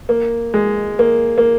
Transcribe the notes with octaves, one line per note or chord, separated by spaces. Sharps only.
A#3
G#3
A#3
A#3